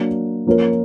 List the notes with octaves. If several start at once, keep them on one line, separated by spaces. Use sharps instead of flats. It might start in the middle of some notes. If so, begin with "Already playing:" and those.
Already playing: F#3 A#3 D4
F3 A#3 C#4 F4 A#4